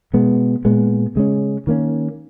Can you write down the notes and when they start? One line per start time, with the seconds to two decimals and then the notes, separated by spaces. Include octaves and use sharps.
0.13 B2 G#3 B3
0.65 A#2 G#3 B3
1.16 C#3 G#3 C#4
1.67 D#3 A#3 C#4